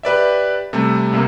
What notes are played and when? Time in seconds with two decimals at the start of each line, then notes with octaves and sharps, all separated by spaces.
0.03 G4 B4 D5 E5
0.73 C3 G3 A3 C4
1.12 C2 C3 A#3